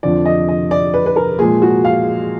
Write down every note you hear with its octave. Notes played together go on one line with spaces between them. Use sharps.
F2 D3 F3 D5
D#5
D#5
D5
B4
B4
A#4
A#2 F3 G#3 G#4
F#4
F5